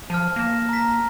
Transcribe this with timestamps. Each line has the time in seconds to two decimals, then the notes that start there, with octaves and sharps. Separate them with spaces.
0.10 F3 A5 F6
0.36 A#3 A#6 E7
0.69 A#5 B6